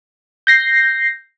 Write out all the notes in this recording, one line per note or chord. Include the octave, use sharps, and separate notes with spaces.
G6 A#6 C7